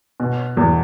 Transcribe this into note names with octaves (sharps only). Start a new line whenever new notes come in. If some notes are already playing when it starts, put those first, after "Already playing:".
B2
E2